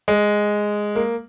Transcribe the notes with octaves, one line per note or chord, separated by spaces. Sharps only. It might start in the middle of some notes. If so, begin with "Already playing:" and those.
G#3
A#3